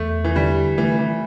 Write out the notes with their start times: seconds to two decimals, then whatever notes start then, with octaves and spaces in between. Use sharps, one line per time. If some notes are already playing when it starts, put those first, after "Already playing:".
Already playing: E2 A3
0.24 E3
0.36 D3 G3
0.78 E3 A3
0.99 E3